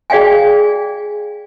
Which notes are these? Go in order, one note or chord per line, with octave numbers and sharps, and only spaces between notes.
G#4 D5 F5 G5 G#5